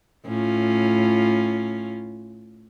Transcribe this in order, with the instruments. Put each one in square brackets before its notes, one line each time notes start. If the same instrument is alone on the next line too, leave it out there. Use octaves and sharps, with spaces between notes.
[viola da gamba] A2 C#4 F4